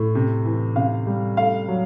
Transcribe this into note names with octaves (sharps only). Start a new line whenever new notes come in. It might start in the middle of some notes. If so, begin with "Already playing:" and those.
Already playing: A2
C3
E3
C3 F5
G3
A3 F5
F#3